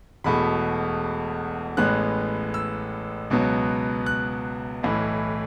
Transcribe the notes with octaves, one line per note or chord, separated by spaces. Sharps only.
E1 E2 B2 A3 B5
A1 A2 G#3 B3 F#6
E6
C#2 B2 F#3 B3
F#6
B1 A2 E3